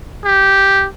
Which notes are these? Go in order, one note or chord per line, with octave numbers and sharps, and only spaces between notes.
G4